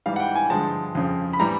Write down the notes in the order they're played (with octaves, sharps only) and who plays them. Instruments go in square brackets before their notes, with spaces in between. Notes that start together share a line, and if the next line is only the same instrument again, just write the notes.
[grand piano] G#2 E3 G3 F5
F#5
G5
G#5
G2 D3 F3 G#3 A5
F2 C#3 F3
B5
A2 E3 G3 A#5